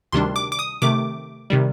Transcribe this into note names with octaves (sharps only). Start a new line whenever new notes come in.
D2 C3 D#3 G3 D4 C6
D6
D6
D#6
C3 D#3 A3 D6
C3 D#3 G3